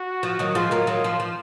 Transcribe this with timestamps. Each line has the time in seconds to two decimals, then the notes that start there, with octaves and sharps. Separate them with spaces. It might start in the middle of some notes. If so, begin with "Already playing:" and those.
Already playing: F#4
0.23 F3
0.39 D#3 F#3
0.55 F3 G#3 F4
0.71 F#3 A#3
0.87 D#3 F#3
1.04 F3
1.20 F3